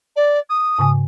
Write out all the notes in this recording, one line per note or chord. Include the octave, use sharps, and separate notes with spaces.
D5
D#6
G#2 C#3 G#5